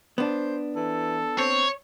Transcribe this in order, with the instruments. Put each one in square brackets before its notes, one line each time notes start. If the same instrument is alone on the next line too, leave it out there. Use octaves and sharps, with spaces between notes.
[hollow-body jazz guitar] B3 D4 [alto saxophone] C5
[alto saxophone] E3 [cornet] A4
[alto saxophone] C4 [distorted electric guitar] C#5